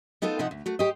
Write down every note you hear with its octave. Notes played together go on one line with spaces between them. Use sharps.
B3 D#4 F4 A4 C5
C3 F3 D#4 C5 F#5
D2
A3 F#4
G4 C5 C#5 D#5